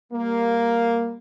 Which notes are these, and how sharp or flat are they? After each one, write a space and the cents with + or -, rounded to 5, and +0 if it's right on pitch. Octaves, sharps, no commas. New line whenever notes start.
G3 +15 A#3 +0